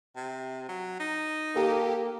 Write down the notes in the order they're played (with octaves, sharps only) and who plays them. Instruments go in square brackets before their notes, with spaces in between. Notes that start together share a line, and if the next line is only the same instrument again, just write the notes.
[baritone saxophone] C3
F#3
D#4
[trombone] A#3 [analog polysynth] G4 A4